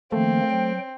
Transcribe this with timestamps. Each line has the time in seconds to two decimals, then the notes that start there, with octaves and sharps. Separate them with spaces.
0.12 D#3 F3 A3 A#3 C4
0.50 F#3 C5 G5